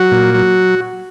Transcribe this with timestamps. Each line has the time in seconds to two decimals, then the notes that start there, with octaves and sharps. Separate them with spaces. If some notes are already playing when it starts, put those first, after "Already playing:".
Already playing: F#3 F#4
0.11 A#2
0.34 F#3